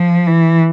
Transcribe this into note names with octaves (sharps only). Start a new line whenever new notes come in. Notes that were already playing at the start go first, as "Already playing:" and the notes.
Already playing: F3
E3